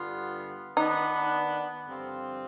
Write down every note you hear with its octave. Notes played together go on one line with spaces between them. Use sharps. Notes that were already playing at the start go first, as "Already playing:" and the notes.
Already playing: G2 D3 G3 B3 F4
D#3 B3 D4 D#4
G2 D3 F3 C4 F4